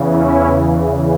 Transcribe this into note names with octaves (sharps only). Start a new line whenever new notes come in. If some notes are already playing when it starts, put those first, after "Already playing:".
Already playing: E2 C#3 E3
C#4 E4